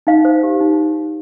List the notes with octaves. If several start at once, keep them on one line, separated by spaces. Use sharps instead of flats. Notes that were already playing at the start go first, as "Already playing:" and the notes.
D#4 F5
C5
G4
D#4